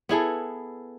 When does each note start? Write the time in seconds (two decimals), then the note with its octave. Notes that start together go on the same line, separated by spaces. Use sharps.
0.09 B3 E4 G#4 A4